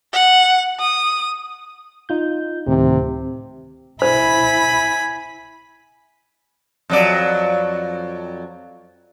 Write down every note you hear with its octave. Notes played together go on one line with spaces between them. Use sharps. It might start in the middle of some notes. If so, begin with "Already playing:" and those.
F#5
D#6
D#4 F4 G6
D2 A2 C3 D#3
E4 C5 G#5 B5
F2 F#3 D5